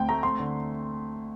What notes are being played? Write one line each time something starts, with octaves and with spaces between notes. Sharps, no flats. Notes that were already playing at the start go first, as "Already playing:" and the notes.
Already playing: D2 C4 G5
A3 A#5
C4 C6
D3